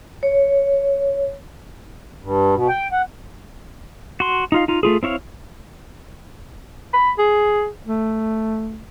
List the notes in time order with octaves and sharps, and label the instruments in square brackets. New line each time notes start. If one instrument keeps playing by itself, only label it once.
[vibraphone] C#5
[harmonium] G2
B2
G5
F#5
[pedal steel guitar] F#4 C6
D#4 F4 F5
D#4 F4
A3 F4 G#4
C4 E4 C#5 F5
[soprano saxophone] B5
G#4
A3